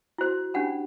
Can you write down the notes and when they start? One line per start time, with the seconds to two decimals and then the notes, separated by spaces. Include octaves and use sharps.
0.18 E4 F#4 C5 C6
0.54 C#4 D4 G4 F#5 B5